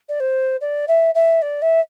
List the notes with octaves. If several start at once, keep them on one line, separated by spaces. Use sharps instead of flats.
D5
C5
D5
E5
E5
D5
E5